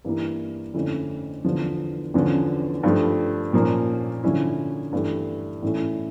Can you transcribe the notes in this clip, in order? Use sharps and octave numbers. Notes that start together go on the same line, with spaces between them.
G2 E3 A#3 E4
F2 D3 A3 C#4 E4
E2 D3 F3
E2 D3 F3 C#4
G2 F3 A3
A#2 F3 A#3 C#4
D3 F3 C#4 E4
G2 E3 A3
A2 E3 A3 C#4 E4